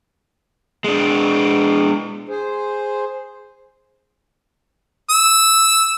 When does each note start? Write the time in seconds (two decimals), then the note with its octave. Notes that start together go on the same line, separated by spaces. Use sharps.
0.84 G#3 D4
2.29 G#4 C5
5.10 E6